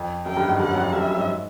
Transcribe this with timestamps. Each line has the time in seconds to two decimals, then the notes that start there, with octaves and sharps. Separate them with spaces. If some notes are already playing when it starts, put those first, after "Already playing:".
Already playing: F2
0.26 F#2 G5
0.37 G2
0.48 G#2
0.59 G2 F#5
0.68 F#2
0.76 F2
0.93 G2 E5
1.00 F2
1.10 F#2
1.18 G#2